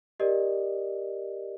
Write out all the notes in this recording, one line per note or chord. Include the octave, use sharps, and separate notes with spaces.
G4 A#4 D5 D#5